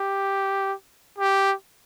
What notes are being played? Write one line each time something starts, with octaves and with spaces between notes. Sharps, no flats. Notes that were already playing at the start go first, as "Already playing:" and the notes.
Already playing: G4
G4